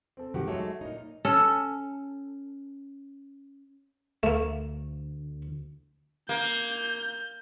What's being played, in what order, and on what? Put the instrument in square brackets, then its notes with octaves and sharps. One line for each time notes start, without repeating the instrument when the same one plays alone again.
[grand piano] C4 A4
[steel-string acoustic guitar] G2 [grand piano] D#3 F#4 G4
[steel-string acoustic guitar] F#3 G#3 A3 [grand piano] C#5
[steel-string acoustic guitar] A#2 D#4
[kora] C#4 [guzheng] A4
[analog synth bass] D2 [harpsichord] A3 A#3
[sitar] A#3 [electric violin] G6